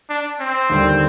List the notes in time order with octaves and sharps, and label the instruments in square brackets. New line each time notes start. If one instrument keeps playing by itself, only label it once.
[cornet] D4
C4
[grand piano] D#2 D3 G3